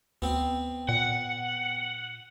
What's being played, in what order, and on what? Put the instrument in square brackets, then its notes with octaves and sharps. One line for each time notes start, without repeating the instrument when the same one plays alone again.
[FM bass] D2 [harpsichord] B3 C4
[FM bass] A#2 [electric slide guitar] F#5